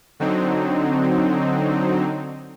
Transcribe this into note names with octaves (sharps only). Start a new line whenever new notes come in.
D3 F#3 C4 D#4